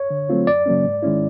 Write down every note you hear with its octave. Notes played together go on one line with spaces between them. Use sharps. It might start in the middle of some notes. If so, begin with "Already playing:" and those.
Already playing: C#5
D3
F#3 A3 C4 F4
F#2 D5
C#3 F#3 A#3 C#4
G#2
D#3 G#3 C#4 E4